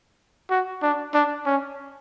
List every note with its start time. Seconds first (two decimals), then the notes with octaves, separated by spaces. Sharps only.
0.50 F#4
0.83 D4
1.14 D4
1.46 C#4